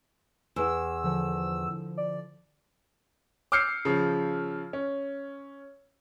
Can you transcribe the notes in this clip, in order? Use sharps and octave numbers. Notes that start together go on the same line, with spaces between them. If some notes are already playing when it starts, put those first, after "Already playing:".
E2 E6
D3 F3
D5
D6 E6 F6 G6 C7 C#7
C#3 F3
C#4